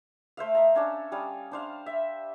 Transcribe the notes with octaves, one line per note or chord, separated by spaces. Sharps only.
A3 C5 E5 F5
D#5 E5 A#5
C#4 D4 A4
G3 C#4 F5 D#6
D4 C5 F5
E5